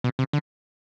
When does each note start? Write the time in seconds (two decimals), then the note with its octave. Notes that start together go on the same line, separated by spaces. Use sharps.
0.04 B2
0.19 C3
0.33 D3